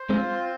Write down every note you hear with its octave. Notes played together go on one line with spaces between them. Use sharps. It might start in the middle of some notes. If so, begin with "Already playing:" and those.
Already playing: C5
G#3 C4 F4
C4